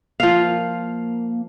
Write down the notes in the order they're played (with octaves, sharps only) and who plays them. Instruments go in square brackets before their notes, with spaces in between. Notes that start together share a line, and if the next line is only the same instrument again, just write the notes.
[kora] F3 F5 [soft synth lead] A#3